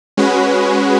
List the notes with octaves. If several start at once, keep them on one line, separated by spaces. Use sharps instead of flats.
G#3 C#4 F#4 B4